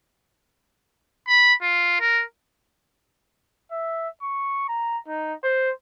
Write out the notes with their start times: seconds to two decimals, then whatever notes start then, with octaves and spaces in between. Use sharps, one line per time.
1.28 B5
1.62 F4
2.00 A#4
3.71 E5
4.23 C#6
4.69 A#5
5.07 D#4
5.43 C5